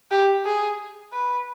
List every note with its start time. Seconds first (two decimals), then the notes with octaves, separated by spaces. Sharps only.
0.11 G4
0.45 G#4
1.13 B4